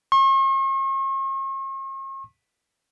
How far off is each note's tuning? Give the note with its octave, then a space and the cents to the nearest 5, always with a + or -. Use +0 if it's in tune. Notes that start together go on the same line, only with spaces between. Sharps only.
C#6 -45